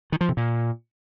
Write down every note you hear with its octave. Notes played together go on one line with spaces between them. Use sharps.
D#3
F3
C3
A#2